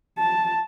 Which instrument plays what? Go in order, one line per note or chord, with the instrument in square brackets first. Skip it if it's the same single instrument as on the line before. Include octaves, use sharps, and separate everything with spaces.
[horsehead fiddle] A5